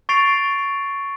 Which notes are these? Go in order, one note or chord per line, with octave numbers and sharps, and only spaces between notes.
C#6 A6 C7 D7 F7